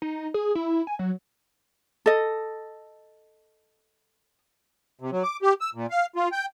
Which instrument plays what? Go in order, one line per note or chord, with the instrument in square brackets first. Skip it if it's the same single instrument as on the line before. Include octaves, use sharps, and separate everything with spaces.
[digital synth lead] D#4
G#4
E4
G#5
F#3
[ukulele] A4 D#5
[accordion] C3
F#3
D6
G4
E6
A#2
F5
F4
G5